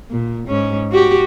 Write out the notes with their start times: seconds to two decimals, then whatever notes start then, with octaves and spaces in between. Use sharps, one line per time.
0.10 A#2
0.48 G#2 C#4
0.91 F#4 G4